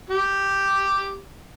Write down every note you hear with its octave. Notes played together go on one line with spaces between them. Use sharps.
G4